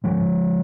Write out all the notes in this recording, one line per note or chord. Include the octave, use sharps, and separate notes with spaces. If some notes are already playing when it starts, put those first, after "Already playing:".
G#2 F3 G#3